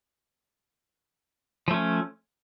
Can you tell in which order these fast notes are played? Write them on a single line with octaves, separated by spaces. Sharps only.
F3 A3 C#4